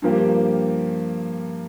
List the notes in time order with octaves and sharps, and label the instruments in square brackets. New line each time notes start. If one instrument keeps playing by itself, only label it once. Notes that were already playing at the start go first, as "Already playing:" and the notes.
[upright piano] G2 F3 A#3 G4